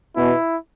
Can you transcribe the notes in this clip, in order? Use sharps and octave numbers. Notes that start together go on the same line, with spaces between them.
B2 E4